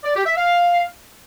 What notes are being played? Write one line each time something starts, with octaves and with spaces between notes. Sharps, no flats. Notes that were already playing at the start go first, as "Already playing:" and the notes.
D5
G4
E5
F5